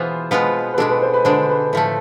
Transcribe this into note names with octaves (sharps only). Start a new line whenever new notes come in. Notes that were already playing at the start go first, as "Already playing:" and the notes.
Already playing: B2 E3 B3 F4 G#4 C5
B2 G#3 B3 F4 B4
B4
B2 G#3 D4 A4
B4
C5
B4
D3 G#3 D4 C5
B4
A2 F3 A3